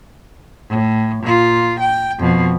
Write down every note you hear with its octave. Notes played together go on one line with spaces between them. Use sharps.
A2
A#2 F4
G5
F2 B2